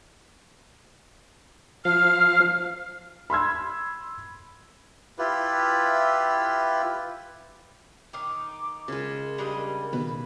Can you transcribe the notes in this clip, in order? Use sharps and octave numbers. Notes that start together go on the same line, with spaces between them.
F3 F5 F6
B5 C6 E6 G#6
E4 F4 G4 B4
D#3 D#4 D6
C#3 G#3 A#4
G3 D4 D#5
B2 D#3 B4